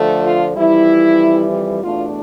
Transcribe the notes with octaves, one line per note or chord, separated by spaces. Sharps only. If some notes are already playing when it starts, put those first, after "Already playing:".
Already playing: D3 F3 A3
F4
F2 E3 G3 E4
E2 B2 A3 D4 F4